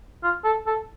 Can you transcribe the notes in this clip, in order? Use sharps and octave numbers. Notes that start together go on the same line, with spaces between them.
F4
A4
A4